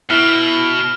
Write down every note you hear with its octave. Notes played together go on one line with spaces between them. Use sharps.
B2 E4 F6